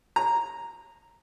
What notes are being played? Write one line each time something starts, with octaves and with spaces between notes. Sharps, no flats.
A#5